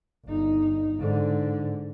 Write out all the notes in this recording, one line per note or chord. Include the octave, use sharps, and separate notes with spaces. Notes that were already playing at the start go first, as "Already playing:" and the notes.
G1 D#4
G#2 D3